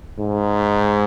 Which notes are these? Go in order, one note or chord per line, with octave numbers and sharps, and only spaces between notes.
G#2